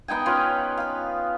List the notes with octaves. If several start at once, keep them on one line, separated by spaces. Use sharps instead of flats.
B3 D#4 G5 G#5
C#4 F4 B4
F5 B5